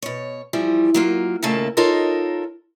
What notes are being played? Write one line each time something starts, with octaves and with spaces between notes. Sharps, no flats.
B2 C#5
E3 F3 G3
F#3 A#3 F4
D#2 A#2 C#3 A3 A#3 A5
D#4 F4 A4 A#4 C#5 D#5